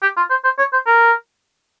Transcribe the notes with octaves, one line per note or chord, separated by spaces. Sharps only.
G4
F4
C5
C5
C#5
C5
A#4